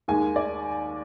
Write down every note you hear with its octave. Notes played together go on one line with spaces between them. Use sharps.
D#2 D#3 G#3 G#5
D5